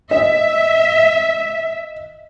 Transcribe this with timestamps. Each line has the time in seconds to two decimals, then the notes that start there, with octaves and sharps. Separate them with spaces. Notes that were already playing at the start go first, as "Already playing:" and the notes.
0.11 D#5 E5